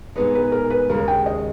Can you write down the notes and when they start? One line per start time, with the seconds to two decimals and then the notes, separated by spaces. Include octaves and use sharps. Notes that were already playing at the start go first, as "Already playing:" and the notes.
0.16 A#2 G#3 B3 D#4 B4
0.35 B4
0.52 A#4
0.70 B4
0.89 D#2 C#3 G#3 A#4
1.08 G5
1.26 D#5